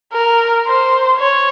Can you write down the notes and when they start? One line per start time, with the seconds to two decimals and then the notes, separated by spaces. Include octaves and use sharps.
0.13 A#4
0.67 C5
1.19 C#5